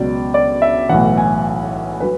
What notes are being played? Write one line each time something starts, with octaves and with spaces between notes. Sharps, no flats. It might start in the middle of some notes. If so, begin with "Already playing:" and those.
Already playing: C#2 B2 F#3 D5
D5
E5
B1 A2 E3 F#5
G#5
F#3 B4